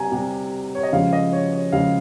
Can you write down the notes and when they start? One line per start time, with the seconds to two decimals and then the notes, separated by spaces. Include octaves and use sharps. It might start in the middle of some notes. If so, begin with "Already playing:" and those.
Already playing: C3 G3 G#5 A#5
0.12 C3 G3
0.75 C#5
0.83 D#5
0.92 C#3 F3 G#3 F5
1.13 D#5
1.33 C#5
1.53 C#5
1.72 C#3 F3 G#3 F5